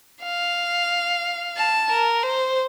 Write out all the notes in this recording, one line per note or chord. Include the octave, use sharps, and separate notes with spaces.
F5
A5
A#4
C5